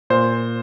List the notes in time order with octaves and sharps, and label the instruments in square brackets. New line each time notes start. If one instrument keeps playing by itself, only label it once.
[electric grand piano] A#2 C5